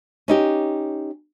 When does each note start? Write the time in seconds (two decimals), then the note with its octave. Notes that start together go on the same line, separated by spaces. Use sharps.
0.28 C#4 D#4 G4